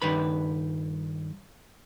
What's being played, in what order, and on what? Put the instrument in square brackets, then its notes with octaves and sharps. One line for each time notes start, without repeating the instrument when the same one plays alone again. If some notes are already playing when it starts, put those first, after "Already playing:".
[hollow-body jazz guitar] G2 D#3 B4 B5